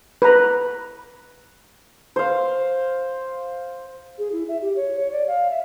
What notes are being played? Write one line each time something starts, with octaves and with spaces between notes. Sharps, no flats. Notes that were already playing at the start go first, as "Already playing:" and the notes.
B4 A#5
C5 F5
G#4
E4
E5
G4
C#5
C#5
D5
F5
E5